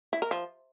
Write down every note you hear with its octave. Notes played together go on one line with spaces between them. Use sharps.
E4
A#4
F3